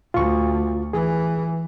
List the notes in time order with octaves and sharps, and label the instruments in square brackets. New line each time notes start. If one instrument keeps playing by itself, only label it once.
[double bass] D2 [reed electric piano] F4 C#6
[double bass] E3 [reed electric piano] G#4